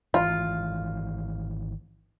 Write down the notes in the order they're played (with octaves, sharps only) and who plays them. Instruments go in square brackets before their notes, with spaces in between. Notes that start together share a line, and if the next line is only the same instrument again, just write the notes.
[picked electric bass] G#1 E3 [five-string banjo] F4